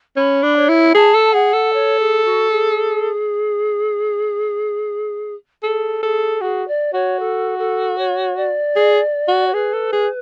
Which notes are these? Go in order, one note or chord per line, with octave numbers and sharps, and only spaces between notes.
C#4 B5
D4
C#5
E4
G#4 A5
A4
G#4 F#5
A4
C#5
G#4
F#4
G#4
G#4 A4
G#4 A4
F#4 G#4
D5
F#4 C#5
A4
A4
C#5
D5
G#4
F#4
C#5
G#4 B4
A4
G#4